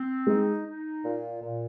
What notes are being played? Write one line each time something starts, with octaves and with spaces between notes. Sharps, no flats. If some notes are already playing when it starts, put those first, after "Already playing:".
Already playing: C4
G#3 D#4
D#4
A#2
A#2